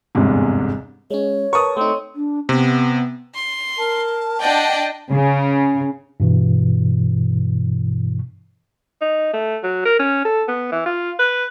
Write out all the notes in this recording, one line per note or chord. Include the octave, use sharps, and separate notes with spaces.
G1 E2 G#2 C3
G#3 C#4 C#5
A#4 B4 A5 C#6 D#6
A3 C4 D#4
D4
C3 B3
C6
A#4 A5
D4 D5 D#5 F#5 G5
C#3
G2 B2 E3
D#4
A3
F#3
A#4
C#4
A4
B3
E3
F4
B4